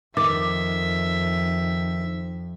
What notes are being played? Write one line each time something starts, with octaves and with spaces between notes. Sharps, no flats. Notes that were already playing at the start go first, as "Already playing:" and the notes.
F2 D#3 E5 D6